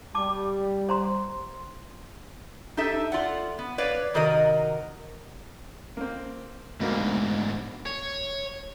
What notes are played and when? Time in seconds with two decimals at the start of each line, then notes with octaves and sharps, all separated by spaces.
0.15 G3 A5 D6
0.89 C5 A#5 C6
2.77 D#4 G4 A4 E5
3.12 F4 D5 F#5
3.59 B3
3.78 B4 C#5 D5 F5
4.14 C3 D#3 F#4 A#4 D#5
5.97 A#3 C4
6.80 D2 G#2 B2 A#3
7.86 C#5